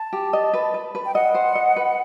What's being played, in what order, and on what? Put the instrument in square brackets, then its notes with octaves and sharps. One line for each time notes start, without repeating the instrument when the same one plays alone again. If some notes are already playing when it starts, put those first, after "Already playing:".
Already playing: [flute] A5
[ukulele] G4
D#5
B4
B4
B4
[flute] G5
[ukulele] D#5 [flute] F#5
[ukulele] C5
D#5
B4